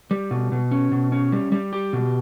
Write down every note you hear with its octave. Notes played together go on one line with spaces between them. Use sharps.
G3
B2
B2
C#4
B2
C#4
G3
G3
G4
B2